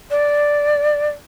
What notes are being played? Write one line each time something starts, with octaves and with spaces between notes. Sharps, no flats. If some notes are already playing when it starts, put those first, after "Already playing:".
D5